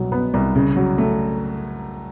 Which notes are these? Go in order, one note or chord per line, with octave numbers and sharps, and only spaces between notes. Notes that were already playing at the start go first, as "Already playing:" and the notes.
Already playing: C2 B2 F#3
B3
C2
C#3
F#3
A3